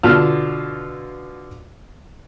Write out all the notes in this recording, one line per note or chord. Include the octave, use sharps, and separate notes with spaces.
B2 D3 F4 A5 F6